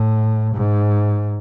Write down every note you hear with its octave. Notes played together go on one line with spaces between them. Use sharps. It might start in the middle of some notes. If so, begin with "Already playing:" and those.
Already playing: A2
G#2